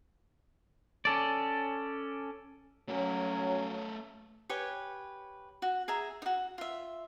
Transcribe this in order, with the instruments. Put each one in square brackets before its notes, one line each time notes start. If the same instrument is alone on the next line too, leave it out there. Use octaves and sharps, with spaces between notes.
[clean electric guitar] C#4 A4 D5
[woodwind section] F#3 C#4 [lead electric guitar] A3 A#4
[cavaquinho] G4 B4 C#5 G#5
F#4
G#4 E5 A#5
D#4 F#4
F4 E5